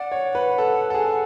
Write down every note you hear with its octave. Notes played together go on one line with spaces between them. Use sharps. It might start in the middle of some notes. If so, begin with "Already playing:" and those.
Already playing: D5 F#5
C#5
B4
A4
A4
G#4